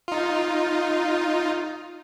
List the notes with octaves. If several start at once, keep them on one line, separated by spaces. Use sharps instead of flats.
D#4 F4